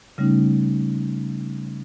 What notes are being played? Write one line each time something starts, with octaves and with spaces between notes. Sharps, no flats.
C#3 G3 A3 C#4 D#4